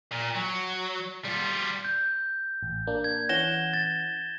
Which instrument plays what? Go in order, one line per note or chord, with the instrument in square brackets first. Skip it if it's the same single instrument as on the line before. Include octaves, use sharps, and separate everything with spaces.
[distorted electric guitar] A#2
F#3
G3 F4
[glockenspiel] G6
[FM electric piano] A1
A#3 D4
[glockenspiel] G#6
[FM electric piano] E3 C#4 F#5 [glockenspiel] A#6 E7 G7
[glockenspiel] A6